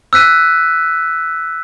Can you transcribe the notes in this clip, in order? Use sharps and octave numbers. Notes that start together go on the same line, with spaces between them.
E6 F#6 B6 D#7